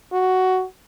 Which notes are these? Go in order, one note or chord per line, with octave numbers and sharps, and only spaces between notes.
F#4